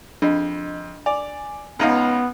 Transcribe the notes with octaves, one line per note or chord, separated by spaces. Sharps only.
F2 D4 D#5
D5 G#5
C#2 B3 D#4 F5